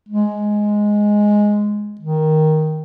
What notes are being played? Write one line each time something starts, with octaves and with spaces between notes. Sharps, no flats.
G#3
D#3